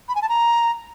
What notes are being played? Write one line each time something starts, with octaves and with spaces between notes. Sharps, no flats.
B5
G#5
A5
A#5